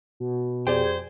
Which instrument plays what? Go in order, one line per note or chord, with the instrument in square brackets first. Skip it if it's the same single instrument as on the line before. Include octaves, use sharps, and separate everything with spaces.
[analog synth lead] B2
[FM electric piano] F2 G#4 G#6 [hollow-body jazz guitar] G4 D5 G5 [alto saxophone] C5